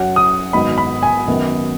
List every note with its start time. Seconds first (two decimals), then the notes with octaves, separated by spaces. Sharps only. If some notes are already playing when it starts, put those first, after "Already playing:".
Already playing: F#2 F#3 C#4 F#5
0.16 D#6
0.53 G#1 G#2 F#3 B3 D#4 B5
0.78 B5
1.03 G#5
1.28 F#2 D#3 B3